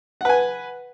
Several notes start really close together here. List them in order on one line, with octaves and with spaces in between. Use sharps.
F#5 B4 G#5